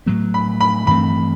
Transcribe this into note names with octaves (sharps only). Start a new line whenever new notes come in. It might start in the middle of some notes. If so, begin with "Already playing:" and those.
A2 F#3 B3
B5
B5
G2 E3 A3 C4 B5